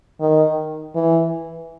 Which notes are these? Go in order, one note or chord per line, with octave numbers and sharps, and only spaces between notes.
D#3
E3